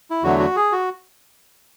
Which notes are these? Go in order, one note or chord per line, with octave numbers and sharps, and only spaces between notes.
E4
E2 D3 F#3 A3 F#4
F#4
G#4
F#4